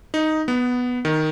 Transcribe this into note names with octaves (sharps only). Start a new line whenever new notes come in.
D#4
B3
D#3